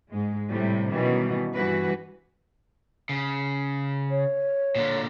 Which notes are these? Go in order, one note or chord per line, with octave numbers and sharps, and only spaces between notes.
G#2 G#3
A2 C3 G3
B2 D#3 E3 F#3 G3 C#4
G2 E3 G3 F#4 B4
C#3
C#5
A#2 D3